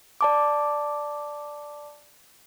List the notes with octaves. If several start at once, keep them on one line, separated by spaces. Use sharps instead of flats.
D5 A5 D6